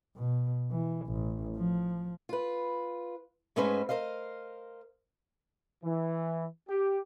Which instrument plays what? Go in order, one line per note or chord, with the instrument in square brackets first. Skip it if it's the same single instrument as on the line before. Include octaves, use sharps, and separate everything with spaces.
[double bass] B2
E3
A1
F3
[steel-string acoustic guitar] F4 B4
G#2 G#3 A3 C#4 B4 C5
A#4 C5 D#5 F5
[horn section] E3
G4